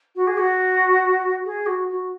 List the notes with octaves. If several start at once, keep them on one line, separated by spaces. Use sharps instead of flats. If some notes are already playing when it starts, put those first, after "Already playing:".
F#4
G#4
F#4
G#4
F#4
F#4